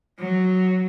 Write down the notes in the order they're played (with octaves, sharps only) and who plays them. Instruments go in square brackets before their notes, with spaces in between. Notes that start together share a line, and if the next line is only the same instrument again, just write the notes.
[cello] F#3